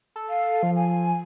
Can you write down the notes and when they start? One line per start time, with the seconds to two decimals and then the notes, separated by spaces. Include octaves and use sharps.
0.16 A4
0.30 F5
0.63 F3
0.76 G#5